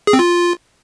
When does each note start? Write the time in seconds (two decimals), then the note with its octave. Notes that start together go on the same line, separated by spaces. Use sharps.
0.07 G#4
0.13 C4
0.19 F4